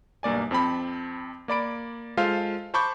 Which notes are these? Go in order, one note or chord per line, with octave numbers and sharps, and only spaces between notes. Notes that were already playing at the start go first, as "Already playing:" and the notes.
B1 G2 A#3 D5 G#5
F2 C4 A5 B5
A#3 D5 B5 D7
G#3 F4 A4 C5 F5
C5 A5 B5 C#6 D6 G6